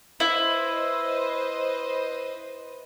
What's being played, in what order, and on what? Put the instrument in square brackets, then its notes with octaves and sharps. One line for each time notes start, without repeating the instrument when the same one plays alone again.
[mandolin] E4 [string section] B4 C5 D#5